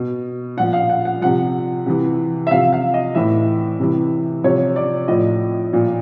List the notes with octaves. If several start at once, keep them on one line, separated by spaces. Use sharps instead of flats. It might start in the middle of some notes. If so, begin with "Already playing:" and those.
Already playing: B2
A#2 F3 F#5
F5
F#5
F#5
C3 F3 F#5
C3 E3
E5
C3 F3 F5
F5
D#5
A2 E3 E5
C3 E3
C3 F3 C#5
D5
A2 F3 D#5
A#2 F3